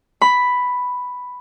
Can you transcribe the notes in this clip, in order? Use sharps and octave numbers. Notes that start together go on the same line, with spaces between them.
B5